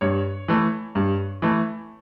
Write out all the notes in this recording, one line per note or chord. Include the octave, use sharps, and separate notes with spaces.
G2 C#5
E3 A3
G2
E3 A3